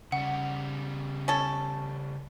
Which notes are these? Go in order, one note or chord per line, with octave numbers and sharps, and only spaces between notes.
C#3 G3 F#5
C#4 A4